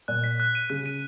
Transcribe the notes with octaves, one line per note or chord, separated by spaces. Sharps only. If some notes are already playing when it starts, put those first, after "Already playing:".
A#2 F#6
B6
F#6
D#7
C#3 F#6
D#7